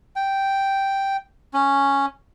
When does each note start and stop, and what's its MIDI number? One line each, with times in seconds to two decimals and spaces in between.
0.16 1.17 79
1.53 2.06 61